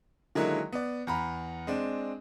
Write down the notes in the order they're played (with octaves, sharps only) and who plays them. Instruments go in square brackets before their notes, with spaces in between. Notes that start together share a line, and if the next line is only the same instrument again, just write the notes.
[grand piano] D3 D#3 F#3 G#3 A#3 E4
B3 D5
E2 A#5 B5
G#3 C4 D4